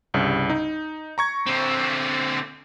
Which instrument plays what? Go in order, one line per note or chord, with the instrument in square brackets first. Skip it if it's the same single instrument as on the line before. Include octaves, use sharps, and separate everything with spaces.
[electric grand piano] C2 G2 C#3
D#4
A#5 C#6 G#6
[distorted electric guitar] D3 C4